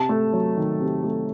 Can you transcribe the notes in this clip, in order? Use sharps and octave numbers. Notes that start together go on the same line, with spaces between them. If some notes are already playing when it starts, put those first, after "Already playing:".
Already playing: C3 A5
A3
F#3
D#3
C3
A3